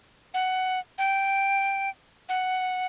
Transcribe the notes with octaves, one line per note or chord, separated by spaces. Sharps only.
F#5
G5
F#5